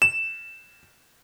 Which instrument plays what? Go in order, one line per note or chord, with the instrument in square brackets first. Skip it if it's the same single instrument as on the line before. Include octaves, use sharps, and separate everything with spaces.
[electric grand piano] E7